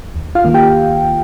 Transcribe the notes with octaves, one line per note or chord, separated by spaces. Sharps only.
D#2
F4 F5
D#3 A#3
G4 G5